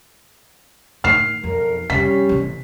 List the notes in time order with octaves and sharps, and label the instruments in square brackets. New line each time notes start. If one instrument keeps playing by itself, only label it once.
[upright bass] A2 D#3 [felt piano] F6 C7
[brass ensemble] B1 A#4 [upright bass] F2
[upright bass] F2 C3 [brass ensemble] G3 C#4 [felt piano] B6
[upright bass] A1 C3